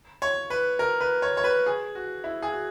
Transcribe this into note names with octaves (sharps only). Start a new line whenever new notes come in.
C#5
B4
A#4
B4
C#5
C#5
B4
G#4
F#4
E4
G#4
F#4